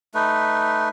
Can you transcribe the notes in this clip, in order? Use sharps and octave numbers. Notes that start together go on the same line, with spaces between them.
A3 D#4 B4